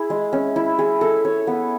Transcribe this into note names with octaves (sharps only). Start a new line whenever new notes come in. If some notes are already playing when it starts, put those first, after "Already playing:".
Already playing: E4 G#4
G#3
C#4
E4
G#4
A4
C#5
B3